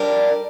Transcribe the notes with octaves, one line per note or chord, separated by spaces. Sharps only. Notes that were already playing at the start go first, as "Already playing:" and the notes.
Already playing: G3 D4 A#4